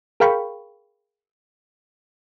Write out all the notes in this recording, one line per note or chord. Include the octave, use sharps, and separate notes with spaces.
G#4 A#4 F5 G5 B5 C#6